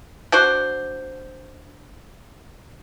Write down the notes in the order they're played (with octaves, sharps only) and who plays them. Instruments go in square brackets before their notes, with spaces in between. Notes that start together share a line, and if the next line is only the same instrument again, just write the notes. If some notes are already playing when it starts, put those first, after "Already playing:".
[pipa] D4 F#4 C5